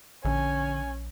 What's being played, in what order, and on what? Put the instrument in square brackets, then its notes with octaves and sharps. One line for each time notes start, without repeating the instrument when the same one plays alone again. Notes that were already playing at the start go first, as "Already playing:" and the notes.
[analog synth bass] A#1 [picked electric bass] D3 [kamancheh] C#4 [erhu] G#5